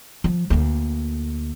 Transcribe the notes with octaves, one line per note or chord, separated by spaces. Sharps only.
F3
D2 A#3